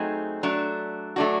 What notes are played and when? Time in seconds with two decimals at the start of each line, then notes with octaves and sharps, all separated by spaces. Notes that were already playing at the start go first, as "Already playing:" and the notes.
Already playing: F#3 A3 C4 D#4 G#4
0.43 F#3 A3 D4
1.16 F#3 A3 D4 F#4